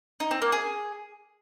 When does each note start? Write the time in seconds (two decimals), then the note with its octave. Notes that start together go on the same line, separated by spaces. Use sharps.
0.20 D#4
0.31 C4
0.42 A#3
0.52 G#4